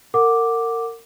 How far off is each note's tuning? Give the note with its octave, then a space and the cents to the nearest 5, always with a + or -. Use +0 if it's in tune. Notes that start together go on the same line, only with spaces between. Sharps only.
A#4 -30 F#5 -10 D6 +0